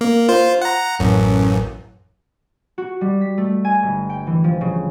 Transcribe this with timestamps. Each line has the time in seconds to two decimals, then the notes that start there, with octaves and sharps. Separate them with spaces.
0.01 A#3
0.29 F4 C5
0.62 F#5 A#5
0.99 A1 F#2
2.78 F#4
3.01 G3
3.21 B6
3.38 A3
3.65 G#5
3.83 G1
4.10 G5
4.27 E3
4.44 F3
4.61 C#3